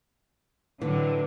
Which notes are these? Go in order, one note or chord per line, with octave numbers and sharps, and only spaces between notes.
A2 D3 E3 F#3